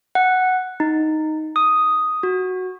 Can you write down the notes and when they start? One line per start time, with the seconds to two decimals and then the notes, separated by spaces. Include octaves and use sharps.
0.15 F#5
0.80 D#4
1.56 D#6
2.23 F#4